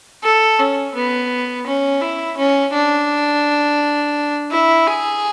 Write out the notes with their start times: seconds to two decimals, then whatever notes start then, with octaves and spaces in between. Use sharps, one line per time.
0.24 A4
0.59 C#4
0.95 B3
1.67 C#4
2.02 E4
2.37 C#4
2.73 D4
4.51 E4
4.87 G#4